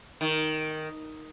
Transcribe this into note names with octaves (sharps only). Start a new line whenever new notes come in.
D#3